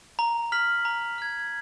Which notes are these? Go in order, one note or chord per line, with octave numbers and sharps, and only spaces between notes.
A#5
F6 B6 F#7
A#5
F6 G#6